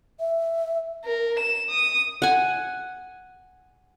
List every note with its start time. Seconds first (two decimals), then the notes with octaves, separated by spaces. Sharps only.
0.20 E5
1.05 A#4
1.39 E7
1.70 D#6
2.22 F#5 G#5